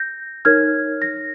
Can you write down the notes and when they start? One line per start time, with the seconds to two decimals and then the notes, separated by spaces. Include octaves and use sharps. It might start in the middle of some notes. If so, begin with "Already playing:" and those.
Already playing: G6 A#6
0.45 D#4 A#4 C#5 F6 G#6
1.02 A#6